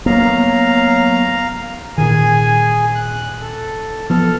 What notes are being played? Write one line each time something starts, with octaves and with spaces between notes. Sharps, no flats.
F#3 A#3 B3 F5 A#5
A#2 D#3 G#4 G#5
F#6
A4
F3 B3 A4 F6